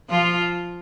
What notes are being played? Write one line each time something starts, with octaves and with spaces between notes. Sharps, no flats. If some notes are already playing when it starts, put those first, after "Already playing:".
F3 F4